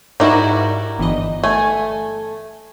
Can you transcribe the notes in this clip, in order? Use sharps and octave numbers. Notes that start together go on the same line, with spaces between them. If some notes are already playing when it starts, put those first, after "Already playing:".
G#2 G3 D#4 E4 F#4 A#4 D5 E7
G1 E3 D#5
A3 G#5